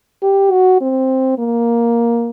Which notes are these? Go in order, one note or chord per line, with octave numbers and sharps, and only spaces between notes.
G4
F#4
C4
A#3